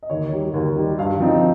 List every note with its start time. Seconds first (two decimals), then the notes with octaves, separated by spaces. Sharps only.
0.03 D#5
0.10 D#2 C#5
0.33 D#3 G3
0.54 D#2
0.76 D#3 G3
0.98 G2 F5
1.20 F3 C4 D#4